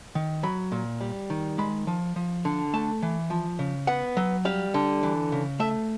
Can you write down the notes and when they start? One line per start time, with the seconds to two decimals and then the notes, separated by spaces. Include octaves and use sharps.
0.15 D#3
0.43 F#3 B5
0.72 A#2
1.01 G3
1.30 D#3
1.58 G#3 B5
1.87 F3
2.16 F3
2.45 D3
2.74 A3 A5
3.02 E3
3.30 F3
3.59 C#3
3.87 B3 F#5
4.17 F#3
4.45 G3 F5
4.74 D3
5.03 E3
5.32 C#3
5.60 A3 E5